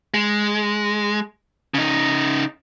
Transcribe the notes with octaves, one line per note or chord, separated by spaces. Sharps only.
G#3
C#3 D#4